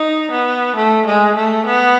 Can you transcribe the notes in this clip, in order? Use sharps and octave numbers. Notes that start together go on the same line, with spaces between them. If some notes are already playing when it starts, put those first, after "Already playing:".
Already playing: D#4
B3
A3
G#3
A3
B3